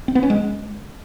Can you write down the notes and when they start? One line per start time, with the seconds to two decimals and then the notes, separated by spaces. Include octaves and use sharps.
0.08 C4
0.15 B3
0.23 C#4
0.30 G#3